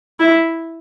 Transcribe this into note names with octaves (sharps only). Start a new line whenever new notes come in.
E4